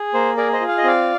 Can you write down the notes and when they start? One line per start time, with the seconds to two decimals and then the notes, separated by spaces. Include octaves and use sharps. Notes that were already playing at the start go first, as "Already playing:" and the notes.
Already playing: G#4
0.14 A#3 C5
0.37 G#4 A#4 D5
0.53 C5 D#5
0.60 F4
0.68 F5
0.78 D#5
0.84 C4 D5 F5